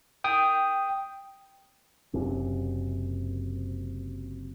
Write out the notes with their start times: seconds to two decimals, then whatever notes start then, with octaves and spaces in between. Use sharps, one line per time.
0.24 G5 D#6
2.13 F#1 F#2 C3